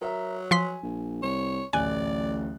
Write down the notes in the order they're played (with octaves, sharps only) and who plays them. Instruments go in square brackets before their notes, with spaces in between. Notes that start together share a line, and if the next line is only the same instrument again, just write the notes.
[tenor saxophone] F#3 [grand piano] A#4 E5 A#5
[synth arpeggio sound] F3 C6 B6 [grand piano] G#5
[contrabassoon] A#1
[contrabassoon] C2 [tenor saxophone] C#5
[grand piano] D1 F#6 [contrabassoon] A1 [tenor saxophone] D5 [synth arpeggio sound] G#5